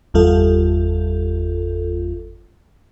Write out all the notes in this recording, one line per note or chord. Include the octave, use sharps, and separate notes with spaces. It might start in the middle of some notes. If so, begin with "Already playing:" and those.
G1 E2 G3 F4 A4